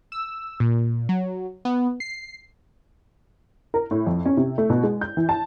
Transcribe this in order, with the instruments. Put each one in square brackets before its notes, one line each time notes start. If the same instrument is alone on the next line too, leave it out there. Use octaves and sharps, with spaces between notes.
[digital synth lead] E6
A#2
F#3
B3
C7
[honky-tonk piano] A#4
A2
F2
C#4
C3
A3
B2
G#3
G6
E3
A5